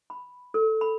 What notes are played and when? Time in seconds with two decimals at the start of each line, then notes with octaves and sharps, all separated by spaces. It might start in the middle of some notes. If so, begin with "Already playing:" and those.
0.10 B5
0.54 A4
0.81 B5